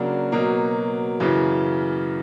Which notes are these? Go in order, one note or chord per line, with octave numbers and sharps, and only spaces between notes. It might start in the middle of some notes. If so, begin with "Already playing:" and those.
Already playing: C#3 F#3 A#3 D4 F#4
B2 F#3 A#3
F#2 C#3 E3